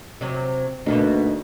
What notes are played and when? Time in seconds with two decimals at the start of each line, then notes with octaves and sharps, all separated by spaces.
0.21 C3 F#3
0.86 D2 B2 A#3 D#4